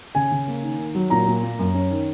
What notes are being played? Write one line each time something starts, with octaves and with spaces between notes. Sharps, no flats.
C#3 G#5
C#3
A#3
D#3
D#3
F#3
A#2 A#5
A#2
A#3
F#2
C#4
D#3